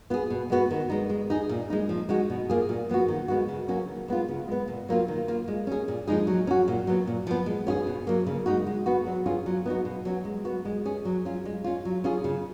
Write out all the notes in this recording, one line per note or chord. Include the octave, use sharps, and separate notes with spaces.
B3 F4 G#4
B2
G#3 B3 F#4
D#3
G#3 D#4
G#3
D#4 G#4
A#2
G#3 D#4
F3
G#3 D#4 F#4
B2
A#3 F4 G#4
A#2
F3 B3 F#4
D#3
G#3 B3 F#4
C#3
F#3 A#3 C#4 F#4
D#3
G#3 B3 F4
C#3
G#3 B3
A#2
F#3 A#3 F4
D#3
A#3 F4
G#3
C#4 G#4
A#2
F3 G#3 D#4 G#4
F#3
C#4 F#4
A#2
F#3 B3
A#2
F3 B3
G#3
C#4 F4 G#4
B2
F#3 A#3
C#3
G#3 D#4 F#4
G#3
B3 F#4
F#3
C#4 F4 G#4
F#3
B3 D#4 F#4
B2
F#3 C#4 F#4
G#3
B3 F#4
G#3
C#4 G#4
F#3
C#4 F4
G#3
C#4 F4
F#3
C#4 F4 G#4
C#3